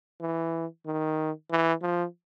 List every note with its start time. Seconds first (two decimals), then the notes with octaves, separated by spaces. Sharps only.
0.21 E3
0.86 D#3
1.51 E3
1.82 F3